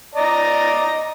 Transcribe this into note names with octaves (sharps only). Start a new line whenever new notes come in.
D5 D#5 A#5